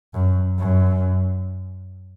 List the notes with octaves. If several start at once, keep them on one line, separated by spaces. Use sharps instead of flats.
F#2
F#2